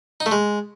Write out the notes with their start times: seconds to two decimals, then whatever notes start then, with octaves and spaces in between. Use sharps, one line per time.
0.20 D#4
0.26 A3
0.32 G#3